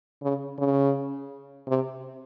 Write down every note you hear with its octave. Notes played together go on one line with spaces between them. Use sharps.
C#3
C#3
C3